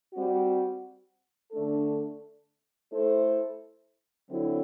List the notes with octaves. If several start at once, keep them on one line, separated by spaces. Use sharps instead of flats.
G3 C4 F#4
D3 A3 D4 A4
A3 E4 A4 C5
D3 F#3 C4 E4